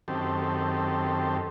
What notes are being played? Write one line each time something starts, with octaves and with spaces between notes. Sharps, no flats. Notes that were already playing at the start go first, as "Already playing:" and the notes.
F#2 D#3 C4 G4 A4